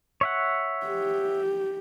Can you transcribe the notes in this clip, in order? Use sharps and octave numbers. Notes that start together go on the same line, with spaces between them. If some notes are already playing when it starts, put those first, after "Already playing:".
C#5 E5 F#5
G4